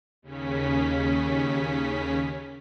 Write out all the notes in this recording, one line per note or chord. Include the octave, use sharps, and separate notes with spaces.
D#2 C#3 C#4 B6